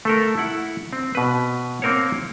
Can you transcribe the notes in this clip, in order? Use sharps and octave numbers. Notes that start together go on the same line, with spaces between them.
A3 A4 A#4
E4 F#5
C4
B2 B4
A#3 C4 A#4 C5 C#5